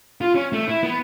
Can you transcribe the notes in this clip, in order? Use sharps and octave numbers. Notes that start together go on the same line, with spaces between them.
F4
C#4
A3
E4
B3